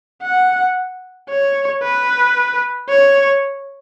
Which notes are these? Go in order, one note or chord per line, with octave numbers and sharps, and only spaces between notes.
F#5
C#5
B4
C#5